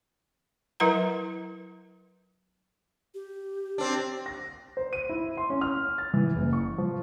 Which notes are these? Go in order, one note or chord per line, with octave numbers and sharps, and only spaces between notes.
F#3 E4 A#4 B4 F#5 A#5
G4
C4 D4
A#6
C5
D#7
E4
C6
C#4
F6
A6
E3
F#1
C#6
F3